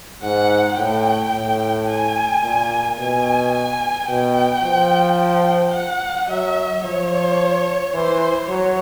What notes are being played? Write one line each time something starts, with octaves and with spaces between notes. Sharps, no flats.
G#2 F#5
A2 G5
A2
G#5
A#2
B2 G#5
G#5
B2 G5
F3
G5
F#5
F#3 E5
F3 C#5
E3 C5
F#3 C#5